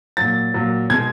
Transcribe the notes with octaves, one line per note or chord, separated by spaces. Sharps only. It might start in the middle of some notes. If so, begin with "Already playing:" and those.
A#2 F#3 A6
A#2 F#3
B2 G#3 G#6